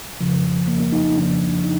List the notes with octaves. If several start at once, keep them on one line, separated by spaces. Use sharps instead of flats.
F2 C#3 F3
A#3
A#3
D#4
D#4
F2 C#3 F3 D4
D#4